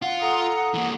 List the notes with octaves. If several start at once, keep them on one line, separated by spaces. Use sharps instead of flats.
F4 F#5
A4 A#5 D#6
E3 A#3